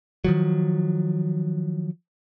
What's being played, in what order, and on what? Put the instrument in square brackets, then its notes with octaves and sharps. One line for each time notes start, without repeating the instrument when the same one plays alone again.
[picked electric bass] D#3 F3 F#3